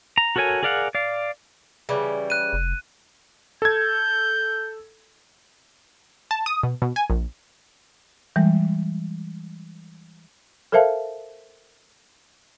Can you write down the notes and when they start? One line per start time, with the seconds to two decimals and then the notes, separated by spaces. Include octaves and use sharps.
0.18 A#5
0.36 F#4 A4 A#4 C#5 G#5
0.63 G#4 A#4 D5 F5 F#5
0.95 D5 F5
1.89 C#3 E3 G3
2.30 F#6 D#7
2.53 F1
3.62 A4 G6 G#6
6.31 A5
6.46 D#6
6.63 B2
6.82 B2
6.96 G#5
7.10 A#1
8.36 E3 G3 G#3
10.72 A4 A#4 C5 E5 F5 A5